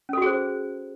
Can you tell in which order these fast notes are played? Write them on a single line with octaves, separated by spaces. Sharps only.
C#4 A4 F#4 G#4 C5